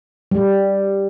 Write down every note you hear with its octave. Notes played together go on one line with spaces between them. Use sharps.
G3